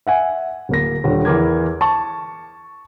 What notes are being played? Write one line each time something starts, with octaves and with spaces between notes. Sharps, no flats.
E5 F#5 G#5
D1 A#3 A#6
D#1 D3
E2 E3 A#4 D6 G#6
A5 C#6